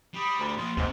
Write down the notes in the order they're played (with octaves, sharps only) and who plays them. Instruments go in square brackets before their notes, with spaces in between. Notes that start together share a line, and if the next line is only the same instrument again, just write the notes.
[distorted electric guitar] G3 [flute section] B5 D#6
[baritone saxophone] D2
[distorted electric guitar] F3 A#3 [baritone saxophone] F4
[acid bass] D#2 [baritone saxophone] G#2 [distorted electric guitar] C3